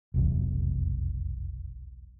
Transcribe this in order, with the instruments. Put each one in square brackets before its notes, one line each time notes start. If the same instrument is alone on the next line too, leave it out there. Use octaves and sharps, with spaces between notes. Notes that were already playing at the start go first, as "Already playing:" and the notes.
[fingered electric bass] F1 B1 E2